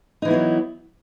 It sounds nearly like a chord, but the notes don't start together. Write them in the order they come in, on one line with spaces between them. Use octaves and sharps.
D#4 E3 E4 B3 F#3